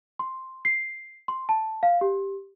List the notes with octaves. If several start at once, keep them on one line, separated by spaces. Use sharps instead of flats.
C6
C7
C6
A5
F5
G4